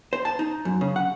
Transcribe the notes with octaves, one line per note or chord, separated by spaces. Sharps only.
C5
A5
D#4
F#2
C#3
F#5